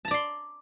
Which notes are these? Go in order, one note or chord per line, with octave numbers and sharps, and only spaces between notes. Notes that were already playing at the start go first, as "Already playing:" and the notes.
D5 A5 A#5 C6